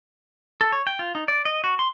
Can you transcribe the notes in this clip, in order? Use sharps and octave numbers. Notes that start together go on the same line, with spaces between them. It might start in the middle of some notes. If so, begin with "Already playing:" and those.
A4
C#5
G5
F4
D#4
D5
D#5
F#4
C6